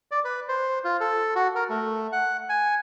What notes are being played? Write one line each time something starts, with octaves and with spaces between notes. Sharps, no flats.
D5
B4
C5
F4
A4
F#4
A#4
A3
F#5
G#5